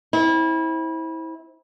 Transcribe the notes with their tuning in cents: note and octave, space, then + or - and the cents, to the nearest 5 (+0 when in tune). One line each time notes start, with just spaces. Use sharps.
C4 +15 E4 -25